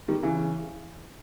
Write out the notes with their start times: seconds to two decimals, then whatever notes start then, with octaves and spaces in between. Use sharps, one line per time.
0.08 D#3 G3
0.23 C#3 E3